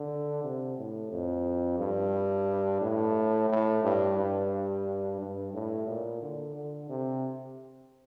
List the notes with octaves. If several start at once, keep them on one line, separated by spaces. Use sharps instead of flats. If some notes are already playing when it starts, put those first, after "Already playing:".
Already playing: D3
C3
A2
F2
G2
A2
A2
G2
G2
G2
A2
A#2
D3
D3
C3